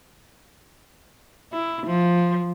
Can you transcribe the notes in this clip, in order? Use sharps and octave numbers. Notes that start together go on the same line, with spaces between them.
E4
F3